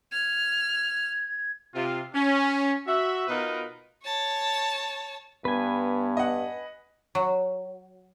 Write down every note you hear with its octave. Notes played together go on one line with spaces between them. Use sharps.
F6 G#6
C3 F4
C#4
F#4 E5
B2 B3 D#4 F4 A#4 B4
C#5 A5
G2 B3 B4 G#5
D#5 F#5
F#3